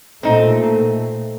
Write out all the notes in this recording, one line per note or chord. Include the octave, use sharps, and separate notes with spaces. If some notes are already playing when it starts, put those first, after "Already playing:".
A#2 A3 C4 D#4